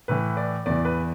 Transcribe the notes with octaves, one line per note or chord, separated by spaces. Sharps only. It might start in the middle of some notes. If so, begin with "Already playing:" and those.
A2 E3 B4
D5
E2 E3 D5
B4